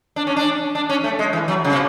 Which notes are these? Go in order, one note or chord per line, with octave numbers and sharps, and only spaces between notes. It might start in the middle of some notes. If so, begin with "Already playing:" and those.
D4
C#4
D4
D4
C#4
A3
G#3
E3
F#3
C#3
B2